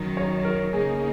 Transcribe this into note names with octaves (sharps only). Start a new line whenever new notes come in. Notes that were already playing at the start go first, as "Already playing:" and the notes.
Already playing: F#2 D#3 F#3
C#5
A#4
C#3 A#3 D#4 G#4